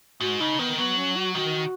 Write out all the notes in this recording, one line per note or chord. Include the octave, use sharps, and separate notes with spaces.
G#2 F#4
C#3 D#4
D#3 B3
F#3 B3
C#4
F#4
D#3 F#4